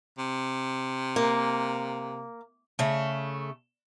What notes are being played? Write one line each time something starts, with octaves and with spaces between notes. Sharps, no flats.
C3
A#3
C#3 A3